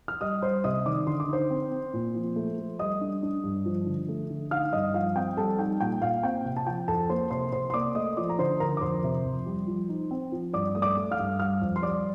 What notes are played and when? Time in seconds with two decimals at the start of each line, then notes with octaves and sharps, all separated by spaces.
0.08 F6
0.21 G3 D#5 D#6
0.42 G3 C5 C6
0.64 C3 D#5 D#6
0.86 D#3 D5 D6
1.07 D3 C6
1.20 D6
1.29 D#4 C5 C6
1.50 C4
1.71 C4
1.93 A#2
2.15 F3
2.36 A3
2.58 A3
2.79 G3 D#5 D#6
3.01 D4
3.22 D4
3.44 G2
3.65 F3
3.86 D3
4.09 A3
4.30 D3
4.51 D#4 F5 F6
4.73 G2 D#5 D#6
4.94 F3 F5
5.16 C4 G5
5.37 G3 A4 A5
5.58 D#4 G5
5.80 A#2 G5
6.01 A#2 F5
6.23 C4 G5
6.45 C3
6.57 A5
6.66 F3 G5
6.88 F2 A4 A5
7.10 A#3 C5 C6
7.30 C3 C5 C6
7.52 C3 C5 C6
7.70 C6
7.74 A#3 D5 D6
7.95 A3 D#5 D#6
8.17 F3 D5 D6
8.29 A#5
8.38 D3 C5 C6
8.60 D3 A#4 A#5
8.77 D6
8.81 F2 C5 C6
9.04 C3
9.25 F2
9.46 G3
9.67 F3
9.89 D#4
10.11 C4
10.32 F3
10.54 G2 D5 D6
10.75 A3 D#6
10.82 D5 D6
10.96 A3
11.11 F5 F6
11.19 G2
11.40 G3 F5 F6
11.61 F2
11.76 C6
11.83 G3 D5 D6